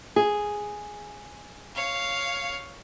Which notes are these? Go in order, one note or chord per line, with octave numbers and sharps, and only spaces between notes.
G#4
C#5 F5